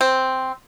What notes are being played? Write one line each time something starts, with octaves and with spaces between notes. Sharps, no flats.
C4